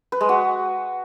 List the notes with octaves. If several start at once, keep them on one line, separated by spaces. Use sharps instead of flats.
B4
G#3
F#4